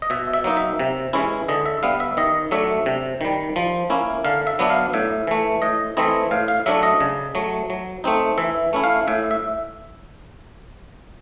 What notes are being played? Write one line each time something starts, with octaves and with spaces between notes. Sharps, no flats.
D#5
B2 E5
E5
F#3 A#3 D#4
E5
C3
E3 G#3 C#4 E4
D3 D#5
E5
G3 B3 F5
E5
D#3 D#5
F#3 A3 D4 E5
C3
D#3 G3
F3
A#3 C#4 E4
D3 F5
E5
F#3 B3 D4
F5
A2 E5
E3 A3
A2 D#5
E3 A3 C4 E4 D#5
A2 F5
F5
F#3 A3 D4 E5
D#5
C#3
F#3 A3
F#3
A3 C4 D#4
E3 E5
A3 C#4 E4
F5
A2 E5
E5